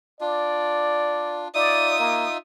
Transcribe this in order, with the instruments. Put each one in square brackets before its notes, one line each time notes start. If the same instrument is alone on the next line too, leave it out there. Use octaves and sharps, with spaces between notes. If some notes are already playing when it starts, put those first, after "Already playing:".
[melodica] D4 F4 [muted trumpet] D5
[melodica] D#4 F4 E5 [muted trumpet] D5 [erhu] D#6
[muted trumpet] A#3